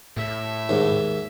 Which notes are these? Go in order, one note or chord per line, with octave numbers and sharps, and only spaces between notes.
A2 E5
D#2 G#2